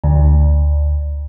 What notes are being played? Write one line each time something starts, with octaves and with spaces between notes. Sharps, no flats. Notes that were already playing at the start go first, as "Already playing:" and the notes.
D2